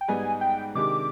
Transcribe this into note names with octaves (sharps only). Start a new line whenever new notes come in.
G5
G#2 G3 B3 D#4 G#4 G#5
G5
C3 D#3 G#3 D4 G4 D6